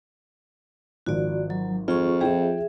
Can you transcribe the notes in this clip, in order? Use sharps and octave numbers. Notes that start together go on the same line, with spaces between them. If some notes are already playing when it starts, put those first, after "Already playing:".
G#1 F3 F#4 D5
F#3
F2 F4 G#4 C#6
F3 G#4 E5 G5